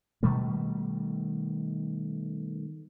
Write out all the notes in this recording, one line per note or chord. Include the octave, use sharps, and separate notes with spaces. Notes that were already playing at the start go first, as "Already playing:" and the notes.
B2 D#3 G3 A3